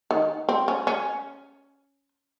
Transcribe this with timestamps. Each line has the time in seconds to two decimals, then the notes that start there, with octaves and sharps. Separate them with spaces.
0.11 D#3
0.49 C4
0.68 C#4
0.87 C#4